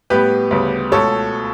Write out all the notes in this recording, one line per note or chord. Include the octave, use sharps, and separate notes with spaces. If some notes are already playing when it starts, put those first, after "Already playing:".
A2 G3 B3 G4 B4
D2 C#3 G3 B3
C#2 B2 A3 A4 C#5